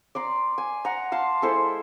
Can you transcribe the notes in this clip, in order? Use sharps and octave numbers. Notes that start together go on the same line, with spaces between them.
D5 A#5 C6
G#5
F#5 A#5
F5 A5 C6
G#3 E4 A4 C5